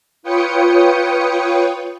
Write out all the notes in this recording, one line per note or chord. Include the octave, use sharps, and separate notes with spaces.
F4 B4 C#5 G5 D#6 C#7